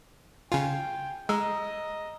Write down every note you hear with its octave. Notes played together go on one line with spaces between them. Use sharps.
C#3 F4 G5 G#5
G#3 D#5 A#5 E6